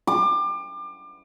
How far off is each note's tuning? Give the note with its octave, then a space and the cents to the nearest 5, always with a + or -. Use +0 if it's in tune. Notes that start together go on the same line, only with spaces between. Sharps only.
D6 +30